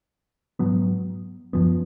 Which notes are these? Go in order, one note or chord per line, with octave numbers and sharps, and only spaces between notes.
G#2 F#3 B3
F#2 F3 B3